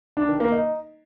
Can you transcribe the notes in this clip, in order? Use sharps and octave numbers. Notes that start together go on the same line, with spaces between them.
D4
D#3
A#3
D#4